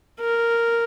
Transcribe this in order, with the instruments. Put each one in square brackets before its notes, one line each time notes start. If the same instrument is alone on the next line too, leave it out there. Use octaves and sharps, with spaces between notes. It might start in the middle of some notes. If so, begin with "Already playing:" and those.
[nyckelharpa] A#4